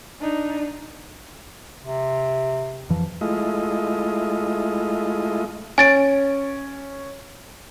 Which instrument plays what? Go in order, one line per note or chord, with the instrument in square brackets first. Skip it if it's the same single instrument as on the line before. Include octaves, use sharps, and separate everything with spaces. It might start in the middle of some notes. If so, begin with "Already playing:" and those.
[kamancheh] D4 D#4
[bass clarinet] C3
[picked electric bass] F2 E3 F3
[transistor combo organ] G#3 A3 E4 F4 D#5
[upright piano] C#4 [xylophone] G#5 A6 D7